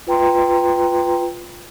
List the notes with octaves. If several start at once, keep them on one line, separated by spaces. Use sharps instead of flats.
F4 B4 G5 A#5 C6